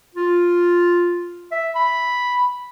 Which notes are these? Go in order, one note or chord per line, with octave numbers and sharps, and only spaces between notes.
F4
E5
B5